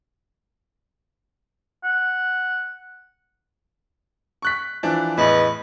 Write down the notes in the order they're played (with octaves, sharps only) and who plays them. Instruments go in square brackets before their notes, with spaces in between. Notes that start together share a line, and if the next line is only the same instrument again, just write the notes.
[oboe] F#5
[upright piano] C#6 F#6 B6
E3 F3 D4
[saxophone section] E2 B4 D#5 [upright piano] A2